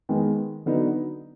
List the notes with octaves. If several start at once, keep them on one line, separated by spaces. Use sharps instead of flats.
D#3 G#3 B3
D3 F#3 B3 D#4